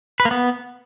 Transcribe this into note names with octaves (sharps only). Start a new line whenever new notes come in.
B4
A#3
B3